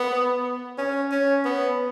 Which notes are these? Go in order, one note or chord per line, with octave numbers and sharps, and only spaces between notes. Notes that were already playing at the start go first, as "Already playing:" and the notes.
Already playing: B3
C#4
C#4
B3